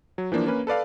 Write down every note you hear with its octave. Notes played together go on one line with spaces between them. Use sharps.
F#3
E3 F3 A#3 D4
A#3 C#4 B4
A4 B4 D5 F5